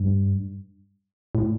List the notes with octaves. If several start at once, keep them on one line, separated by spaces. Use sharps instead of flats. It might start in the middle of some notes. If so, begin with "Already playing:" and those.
Already playing: G2
A2